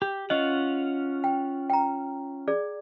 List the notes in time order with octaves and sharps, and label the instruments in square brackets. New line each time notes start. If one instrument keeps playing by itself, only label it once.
[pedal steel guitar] G4
[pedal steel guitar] C#4 F4 F#5 [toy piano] D#5
[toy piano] G5
G5 A#5
G#4 D5